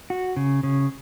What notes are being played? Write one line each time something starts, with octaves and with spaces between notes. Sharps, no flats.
F#4
C#3
C#3